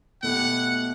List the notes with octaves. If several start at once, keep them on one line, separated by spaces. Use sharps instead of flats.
B2 A3 E4 G4 F#5